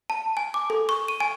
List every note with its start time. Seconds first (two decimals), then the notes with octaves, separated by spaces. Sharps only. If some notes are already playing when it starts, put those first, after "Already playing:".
0.10 A5
0.37 G#5
0.54 D6
0.70 A4
0.89 C#6
1.08 D#7
1.20 G#5